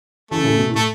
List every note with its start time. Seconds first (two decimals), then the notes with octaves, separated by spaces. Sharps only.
0.31 C#3 E3 A3
0.44 A2 C#3
0.57 B2
0.69 A2
0.75 A3